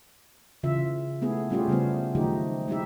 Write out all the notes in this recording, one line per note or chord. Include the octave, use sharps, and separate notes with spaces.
C#3 E3 F4 E5
A3 B3 E4 G#4
G3 A3 C#4 F4 G4 G#4
C#3 G3 A3 B3 C5
D#3 F3 F#3 A3 D#4 G4
G#3 D#4 E4 G4 E5